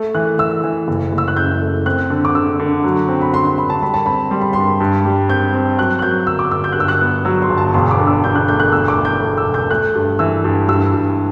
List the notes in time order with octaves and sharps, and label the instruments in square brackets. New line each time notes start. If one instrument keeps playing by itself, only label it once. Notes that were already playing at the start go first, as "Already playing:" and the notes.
Already playing: [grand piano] A3
[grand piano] E3 [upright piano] F#6
[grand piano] E3 [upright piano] E6
[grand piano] E3
F#1
F#1
[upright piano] E6
F#6
[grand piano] F#2 [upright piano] G6
[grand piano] A3
[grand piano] C4 [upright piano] F#6
[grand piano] D3
[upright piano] D6
[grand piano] D3 [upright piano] E6
[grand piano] D3
F#3
C4
[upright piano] B5
[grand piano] D3 [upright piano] C6
[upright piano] C6
[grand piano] D3 [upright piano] B5
[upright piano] A5
[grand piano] G3 [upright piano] B5
[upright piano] A5
[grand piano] C4 [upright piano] B5
[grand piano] G3 [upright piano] C6
[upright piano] B5
[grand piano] G2 [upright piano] C6
[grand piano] G2
G3
[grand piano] C4 [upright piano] G6
[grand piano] C4
[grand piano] F#3 [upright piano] F#6
[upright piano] F#6
[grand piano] F#3 [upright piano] G6
[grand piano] G1 [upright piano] E6
[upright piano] D6
[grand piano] G1 [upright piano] E6
[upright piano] G6
F#6
[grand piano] G2 [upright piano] E6
[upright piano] F#6
[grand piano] B3
[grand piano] F#3 [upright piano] E6
[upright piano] C6
[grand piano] G1
[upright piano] A5
[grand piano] E1 [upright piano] C6
[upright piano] D6
[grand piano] D3
[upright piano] E6
[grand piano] D3 [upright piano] G6
[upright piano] F#6
[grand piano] A3 [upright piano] G6
[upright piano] F#6
[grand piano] E2 [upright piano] E6
[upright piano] D6
[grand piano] A3
[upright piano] G6
[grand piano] A3
[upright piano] E6
[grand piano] E1
[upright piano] G6
[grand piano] A3 [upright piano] F#6
[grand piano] G2
[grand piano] E3 [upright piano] E6
[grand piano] G2
[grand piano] G2 [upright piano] E6
[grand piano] G2